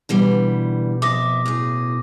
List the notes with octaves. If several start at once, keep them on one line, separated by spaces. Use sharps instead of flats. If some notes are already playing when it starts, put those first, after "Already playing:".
B2 D3 E3 G3
F2 E5 D6 D#6 A#6
A2 G#4